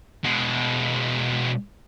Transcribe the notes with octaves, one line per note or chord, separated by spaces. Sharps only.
B2 G#3